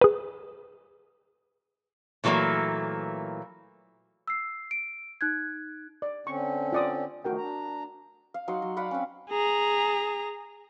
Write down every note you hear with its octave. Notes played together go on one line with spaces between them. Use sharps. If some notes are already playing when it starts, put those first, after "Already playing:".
G#4 B4
A#2 E3 F#3 A3 A#3
E6 C7
D7
D#4 F#6 G#6
D5
D3 C4 C#4 C#6
F4 D5 D#6
D#3 F3 A3 F#4 A#4 G5
D4 A#5
F5
F#3 D#4 F#5 C6
F#3
D5 F5 F#5 B5
C4 C#4
G#4 A#5